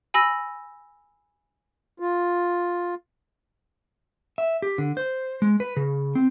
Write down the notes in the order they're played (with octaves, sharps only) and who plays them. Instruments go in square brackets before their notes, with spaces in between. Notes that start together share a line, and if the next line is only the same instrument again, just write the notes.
[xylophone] G#5 B5 E6 A#6 D#7
[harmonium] F4
[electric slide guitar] E5
G4
D3
C5
G#3
B4
C#3
C4